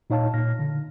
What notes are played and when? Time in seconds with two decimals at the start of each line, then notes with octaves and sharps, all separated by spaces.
0.10 A#2 D#4 C#5 F5 A5
0.33 A#2 F6 A#6
0.59 D3